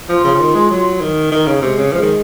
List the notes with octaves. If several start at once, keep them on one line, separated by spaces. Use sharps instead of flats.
F3 F4
C#3
C#3
D#3
G#3
F#3
D#3
D#3 D#4
C#3
C3 G#3
C#3
F3 G#3
D#3